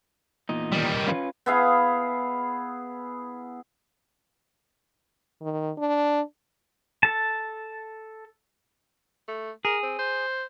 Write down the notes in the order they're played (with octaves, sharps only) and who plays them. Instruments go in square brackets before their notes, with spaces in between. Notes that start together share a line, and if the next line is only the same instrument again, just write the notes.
[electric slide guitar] E2 A#2 D#4
[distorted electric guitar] D#3 G3
[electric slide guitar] C#4 F4 B4
[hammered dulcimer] B3 E4 G#4 F5
[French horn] D#3
D4
[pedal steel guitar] A4 A5
[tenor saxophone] A3
[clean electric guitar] G#4 [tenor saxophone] A#4
[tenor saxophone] C4
C5